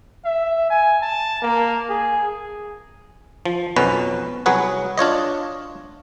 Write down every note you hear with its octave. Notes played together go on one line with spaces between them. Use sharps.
E5
G#5
A5
A#3
G#4
F3
B1 F2 B2 C#4 B4
C2 F#3 G#4 B4 C#5 F#5
D4 F4 C#5 D#5